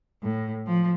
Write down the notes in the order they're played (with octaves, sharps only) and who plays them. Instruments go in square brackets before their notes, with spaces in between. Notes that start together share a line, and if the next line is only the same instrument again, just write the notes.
[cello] A2
F3